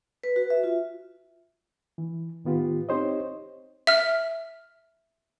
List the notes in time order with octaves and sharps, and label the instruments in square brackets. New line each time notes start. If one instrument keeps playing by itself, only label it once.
[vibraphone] B4
F#4
E5
F4
[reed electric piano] E3
A2 D#3 B3 F4 G4
C4 D#4 G4 C5 C#5 D#5
[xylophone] E5 F6